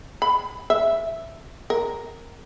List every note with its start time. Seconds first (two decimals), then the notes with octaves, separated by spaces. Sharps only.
0.22 B5
0.70 E5
1.70 A#4